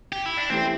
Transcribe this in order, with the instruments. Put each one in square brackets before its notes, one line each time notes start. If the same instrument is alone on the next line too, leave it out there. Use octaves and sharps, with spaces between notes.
[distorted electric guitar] G4
E4
D4
[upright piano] E3 A3 E4 G4 [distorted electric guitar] C4